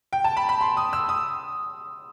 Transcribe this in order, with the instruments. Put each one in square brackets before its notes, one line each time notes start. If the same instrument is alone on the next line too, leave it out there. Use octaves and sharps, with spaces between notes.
[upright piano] G5
A5
B5
B5
C6
D#6
E6
D#6